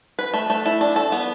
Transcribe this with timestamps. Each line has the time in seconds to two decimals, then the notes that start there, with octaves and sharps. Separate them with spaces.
0.19 B4
0.33 A3
0.50 A3
0.66 E4
0.81 D4
0.96 A4
1.12 B3